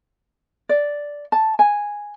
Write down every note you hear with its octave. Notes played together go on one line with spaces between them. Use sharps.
D5
A5
G#5